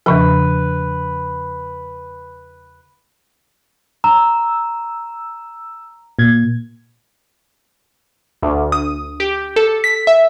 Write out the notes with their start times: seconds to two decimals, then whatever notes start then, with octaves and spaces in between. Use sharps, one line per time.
0.06 E2 C#3 F3 B4
4.04 A#5 E6
6.19 A#2 G#6
8.43 D2
8.72 D#6
9.20 G4
9.56 A4
9.84 B6
10.07 E5